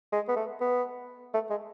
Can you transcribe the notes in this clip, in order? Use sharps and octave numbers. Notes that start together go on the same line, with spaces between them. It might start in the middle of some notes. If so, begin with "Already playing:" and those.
G#3
B3
A3
B3
A3
G#3